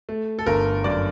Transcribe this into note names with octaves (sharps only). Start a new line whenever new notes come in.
A3
A4
G1 A#4
F#2 D5